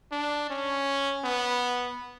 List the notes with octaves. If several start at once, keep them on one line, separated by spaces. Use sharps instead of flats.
D4
C#4
B3